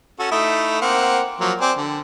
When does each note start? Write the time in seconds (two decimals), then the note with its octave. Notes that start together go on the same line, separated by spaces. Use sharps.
0.19 C#4 F#4 A4
0.32 A3 D#4 E4
0.82 A#3 C4 F#5
1.40 F3 F#3 A#3
1.61 C4 D5 G#5
1.77 D3